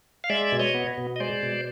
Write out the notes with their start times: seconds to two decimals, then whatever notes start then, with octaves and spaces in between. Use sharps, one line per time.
0.24 F5
0.30 G#3 D5 E5
0.52 B2
0.59 C#5 D#5
0.75 B3
0.98 B2
1.16 D#5
1.20 G#3 C5 D5
1.43 B2